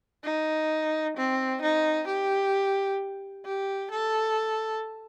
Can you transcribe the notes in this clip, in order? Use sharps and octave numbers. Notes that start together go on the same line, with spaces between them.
D#4
C4
D#4
G4
G4
A4